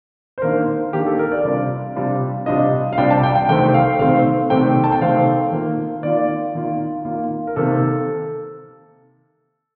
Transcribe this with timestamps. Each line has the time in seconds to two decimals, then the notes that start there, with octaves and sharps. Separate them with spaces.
0.38 C5
0.42 D#3 A#3 D4 A#4
0.93 D#3 A#3 D4 G4
1.06 A4
1.19 A#4
1.32 D5
1.45 C3 G3 D4 F4
1.96 C3 G3 D4 F4
2.46 C3 G3 D4 F4 D#5
2.93 F5
2.97 C3 G3 D4 F4 G5
3.10 A5
3.23 G5
3.35 G5
3.49 C3 D#3 A3 C4 G5
3.74 F5
3.99 C3 D#3 A3 C4 F5
4.50 C3 D#3 A3 C4 G5
4.84 A5
4.92 G5
5.01 C3 D#3 A3 C4 F5
5.52 D#3 A#3 F4
6.03 D#3 A#3 F4 D5
6.55 D#3 A#3 F4
7.05 D#3 A#3 F4
7.47 A#4
7.56 C3 D#3 A#3 A4